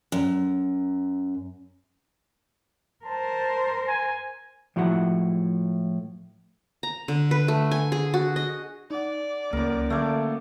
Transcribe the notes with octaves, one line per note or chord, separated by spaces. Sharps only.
F#2
A#4 C5 A5
G#5
A2 F3 G#3 E4 F#4 F#5
A#5
D3
B4
A3
G#5
G#4
F#4
D#5
D#4 D5 F#5
C#2 F#2 A#3 B3 C#4 A#4
D3 A3 F5 D6 G#6